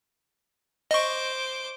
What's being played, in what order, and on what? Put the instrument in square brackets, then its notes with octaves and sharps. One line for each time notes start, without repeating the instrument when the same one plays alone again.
[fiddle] C5 D6 [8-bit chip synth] D#5 C#6